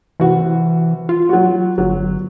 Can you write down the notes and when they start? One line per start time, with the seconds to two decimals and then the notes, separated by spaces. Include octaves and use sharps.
0.20 C2 E3 F#4
1.09 F4
1.29 F#3 F#4
1.78 G1 F#3